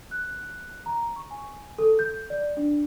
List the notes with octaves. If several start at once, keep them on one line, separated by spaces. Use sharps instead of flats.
F#6
A#5
C#6
G#5
A4
G6
D5
D4